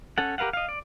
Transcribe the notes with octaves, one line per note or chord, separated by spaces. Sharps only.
C#4 A4 F#5
G4 A#4 B4 F5 F#5
D#5 F5
D5